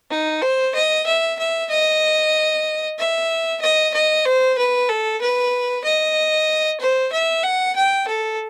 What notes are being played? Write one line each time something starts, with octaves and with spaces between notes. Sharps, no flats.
D#4
C5
D#5
E5
E5
D#5
E5
D#5
D#5
C5
B4
A4
B4
D#5
C5
E5
F#5
G5
A4